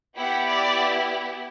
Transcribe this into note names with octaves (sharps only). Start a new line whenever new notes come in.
B3 E4 G4 F#5
D5